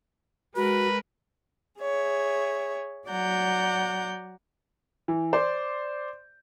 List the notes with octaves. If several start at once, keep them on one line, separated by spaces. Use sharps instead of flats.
G#3 F#4 A#4 B4
G#4 C#5 E5
F#3 D5 F#5 A#5 G6
E3
C5 D5